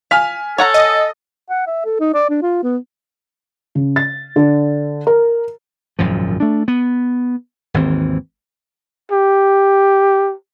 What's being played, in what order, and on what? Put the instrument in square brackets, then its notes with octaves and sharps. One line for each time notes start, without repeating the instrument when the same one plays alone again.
[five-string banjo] F5 [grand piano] G#5 F6 B6
[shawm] A4 [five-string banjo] C#5 F#5 A#5
[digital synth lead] D#5
[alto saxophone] F#5
E5
A4
D#4
D5
D4
F4
B3
[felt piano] C#3
A6
D3
A#4
[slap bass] G#1 F#2 A#2 F3
A3 D4
B3
G#1 D#2 E3 C4
[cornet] G4